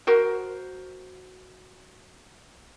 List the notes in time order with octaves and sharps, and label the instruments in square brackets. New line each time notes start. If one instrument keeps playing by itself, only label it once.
[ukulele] F#4 A#4 C5